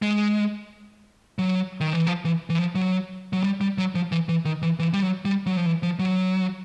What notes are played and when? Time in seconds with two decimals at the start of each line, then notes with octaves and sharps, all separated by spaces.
0.02 G#3
1.39 F#3
1.80 D#3
1.93 E3
2.07 F3
2.25 E3
2.50 E3
2.59 F3
2.75 F#3
3.33 F#3
3.44 G3
3.61 G3
3.78 F#3
3.95 F3
4.12 E3
4.29 E3
4.45 D#3
4.62 E3
4.79 E3
4.93 G3
5.02 F#3
5.25 G3
5.46 F#3
5.56 F3
5.66 E3
5.83 F3
5.99 F#3